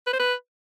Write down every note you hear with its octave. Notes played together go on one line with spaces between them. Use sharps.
B4
C5
B4